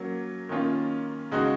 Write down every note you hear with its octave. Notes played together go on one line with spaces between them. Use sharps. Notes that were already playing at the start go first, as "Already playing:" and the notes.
Already playing: F#3 A#3 C#4
D#3 A#3 C#4 F4
C#3 G#3 D#4 F#4